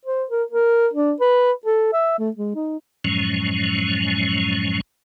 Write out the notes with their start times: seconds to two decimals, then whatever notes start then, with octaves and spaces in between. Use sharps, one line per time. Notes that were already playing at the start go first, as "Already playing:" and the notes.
0.05 C5
0.30 A#4
0.51 A#4
0.93 D4
1.20 B4
1.66 A4
1.93 E5
2.19 A3
2.36 G#3
2.56 D#4
3.05 F#2 A2 F3 F#3 G#3 C#4